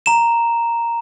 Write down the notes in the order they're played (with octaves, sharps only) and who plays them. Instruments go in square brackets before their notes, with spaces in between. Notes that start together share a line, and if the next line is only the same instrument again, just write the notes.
[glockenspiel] A#5 E7